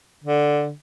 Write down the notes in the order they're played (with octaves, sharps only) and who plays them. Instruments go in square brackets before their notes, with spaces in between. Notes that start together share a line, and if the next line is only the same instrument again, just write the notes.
[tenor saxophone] D3